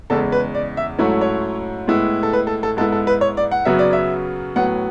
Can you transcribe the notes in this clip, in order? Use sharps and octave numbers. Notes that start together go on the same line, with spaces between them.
E2 C#3 G#3 A4
B4
D5
E5
G#2 F#3 A3 C#4 E4
C#5
A2 G#3 B3 E4
A4
B4
A4
A4
G#2 G#3 B3 E4 A4
A4
B4
C#5
D5
F#5
F#2 C#3 F#3 B3 E5
D5
E5
A2 F#3 B3 F#5